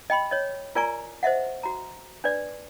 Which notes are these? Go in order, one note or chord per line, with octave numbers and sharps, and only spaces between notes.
D#5 G5 B5 C6
C#5 D#5
F4 A#4 D5 G#5 A#5 C#6
C5 D#5 E5 F#5
F#4 A#5
D4 B4 D5